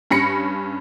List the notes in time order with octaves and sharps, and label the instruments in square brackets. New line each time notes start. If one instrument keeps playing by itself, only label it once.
[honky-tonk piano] G2 C#4 B5 A#6 C#7